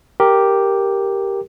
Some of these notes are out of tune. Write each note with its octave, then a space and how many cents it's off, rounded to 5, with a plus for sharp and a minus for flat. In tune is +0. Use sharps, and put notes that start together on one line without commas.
G4 +0 A#4 +0